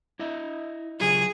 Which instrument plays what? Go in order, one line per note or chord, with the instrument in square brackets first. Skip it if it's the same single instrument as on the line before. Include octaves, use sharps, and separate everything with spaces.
[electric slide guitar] E4 D#5 E5
[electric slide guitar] C#3 F#3 F4 [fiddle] G#4